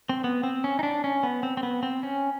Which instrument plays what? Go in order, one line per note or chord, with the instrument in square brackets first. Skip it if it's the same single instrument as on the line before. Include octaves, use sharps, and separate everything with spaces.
[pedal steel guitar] C4
B3
C4
C#4
D#4
D4
C#4
B3
C4
C4
B3
C4
C#4